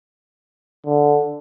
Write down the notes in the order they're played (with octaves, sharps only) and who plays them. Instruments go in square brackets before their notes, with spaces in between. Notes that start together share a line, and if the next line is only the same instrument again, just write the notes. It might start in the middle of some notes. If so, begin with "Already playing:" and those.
[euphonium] D3